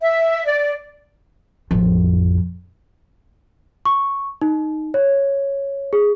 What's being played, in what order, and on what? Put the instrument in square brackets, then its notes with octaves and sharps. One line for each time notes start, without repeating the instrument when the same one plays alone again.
[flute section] E5
D5
[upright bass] A1 F2
[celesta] C#6
D#4
C#5
G#4